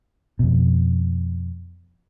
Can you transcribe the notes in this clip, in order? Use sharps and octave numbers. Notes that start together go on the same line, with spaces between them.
F2 B2